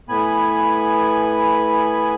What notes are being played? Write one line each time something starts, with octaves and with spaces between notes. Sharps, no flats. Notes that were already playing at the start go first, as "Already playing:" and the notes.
A2 B3 G#5 B5